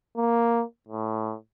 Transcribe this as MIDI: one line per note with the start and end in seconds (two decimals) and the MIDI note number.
0.17 0.63 58
0.88 1.35 45